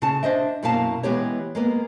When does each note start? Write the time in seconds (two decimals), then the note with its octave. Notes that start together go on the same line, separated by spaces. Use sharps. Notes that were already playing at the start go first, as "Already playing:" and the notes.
0.02 C#3 A5
0.23 D4 C5 D#5 E5
0.63 F#2 B2 A#3 E4 F5 A5
1.03 E3 G#3 B3 G4 C#5
1.55 G#3 A#3 B3